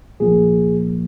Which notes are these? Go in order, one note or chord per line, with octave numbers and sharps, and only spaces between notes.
C2 A#2 F3 A#3 G#4